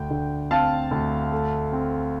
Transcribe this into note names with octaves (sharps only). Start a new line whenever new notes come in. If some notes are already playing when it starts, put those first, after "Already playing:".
Already playing: D2 G5
D3
C4 F5 A5
D2
A3
C4